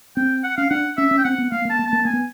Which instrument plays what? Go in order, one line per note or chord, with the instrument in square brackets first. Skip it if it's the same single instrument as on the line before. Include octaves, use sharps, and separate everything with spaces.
[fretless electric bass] C4 [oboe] G5
[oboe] F#5
[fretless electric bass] C#4 [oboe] F5
[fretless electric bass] D4 [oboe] F#5
[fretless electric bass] C#4 [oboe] E5
[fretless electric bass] C#4
[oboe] G5
[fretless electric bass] C4 [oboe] F#5
[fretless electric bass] B3
[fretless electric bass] A#3 [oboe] F5
[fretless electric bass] A#3
[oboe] A5
[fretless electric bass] A#3
[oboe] A5
[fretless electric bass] A#3
[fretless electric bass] A#3 [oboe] G#5
[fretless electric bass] B3